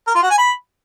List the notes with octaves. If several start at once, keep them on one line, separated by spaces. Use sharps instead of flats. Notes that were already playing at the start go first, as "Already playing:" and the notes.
A#4
F4
F#4
G#5
B5